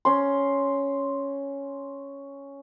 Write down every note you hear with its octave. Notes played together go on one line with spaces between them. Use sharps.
C#4 C6